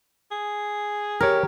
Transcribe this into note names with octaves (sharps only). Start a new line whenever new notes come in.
G#4
G4 A#4 C#5